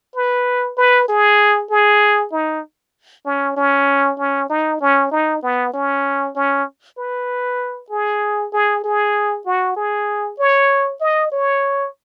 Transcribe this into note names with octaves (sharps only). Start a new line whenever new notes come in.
B4
B4
G#4
G#4
D#4
C#4
C#4
C#4
D#4
C#4
D#4
B3
C#4
C#4
B4
G#4
G#4
G#4
F#4
G#4
C#5
D#5
C#5